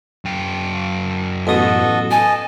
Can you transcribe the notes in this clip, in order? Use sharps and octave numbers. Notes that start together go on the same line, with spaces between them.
F#2 G5
A1 B2 F#4 A4 D#5 D#6
D#5 G#5 A5